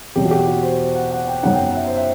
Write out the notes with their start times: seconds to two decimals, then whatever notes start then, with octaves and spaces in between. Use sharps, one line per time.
0.15 E2 B2 F#3 G4
0.25 F#4
0.31 G4
0.47 F#4
0.63 C5
0.95 F#5
1.11 F#5
1.27 G5
1.43 F#2 F#3 B3 D#4 F#5
1.53 G5
1.64 F#5
1.75 E5
1.86 C5
1.96 E5